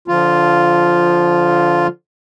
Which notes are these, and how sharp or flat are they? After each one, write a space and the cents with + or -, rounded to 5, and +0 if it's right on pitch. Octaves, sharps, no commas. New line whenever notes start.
D3 -20 F3 +0 F4 +0